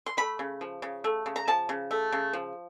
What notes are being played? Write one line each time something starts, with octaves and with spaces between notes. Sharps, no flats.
C6
A3 B5
C#3
F3
C#3
A3
C#3
A#5
F3 A5
C#3
A3
C#3
F3